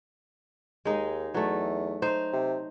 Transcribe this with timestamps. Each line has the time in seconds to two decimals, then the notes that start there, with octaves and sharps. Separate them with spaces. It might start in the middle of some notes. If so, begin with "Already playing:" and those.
0.85 D#2 G#3 D#4
1.34 E2 F#3 A3
2.02 D#4 C5
2.32 C3